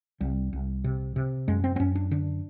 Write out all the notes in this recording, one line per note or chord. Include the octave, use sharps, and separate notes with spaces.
C2 G3
C2
C3
C3
F#2 G#3
C4
C4
F#2 C#4
D4
D3 D4